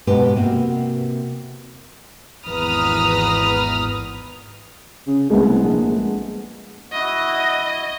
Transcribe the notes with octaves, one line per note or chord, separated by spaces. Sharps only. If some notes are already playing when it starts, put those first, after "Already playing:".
G#2 B2 G4 B4
C3 A#3 F#4
G#1 E2 B4 A#5 D#6 F6
C#3
C2 G#3 A3 B3
A#1
E4 F#4 D#5